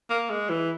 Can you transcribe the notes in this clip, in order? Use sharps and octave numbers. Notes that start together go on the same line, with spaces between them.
A#3
G#3
E3